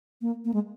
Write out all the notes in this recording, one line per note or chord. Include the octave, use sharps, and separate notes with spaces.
A#3
A#3
G#3